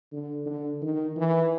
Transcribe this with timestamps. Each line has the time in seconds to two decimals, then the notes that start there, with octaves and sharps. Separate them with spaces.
0.12 D3
0.46 D3
0.82 D#3
1.16 E3